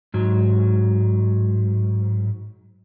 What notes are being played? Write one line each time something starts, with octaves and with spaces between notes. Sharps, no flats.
G#2 F#3